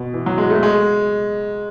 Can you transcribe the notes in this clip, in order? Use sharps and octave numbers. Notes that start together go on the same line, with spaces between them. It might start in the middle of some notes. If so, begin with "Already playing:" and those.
Already playing: B2
E3
F#3
G#3
A3
G#3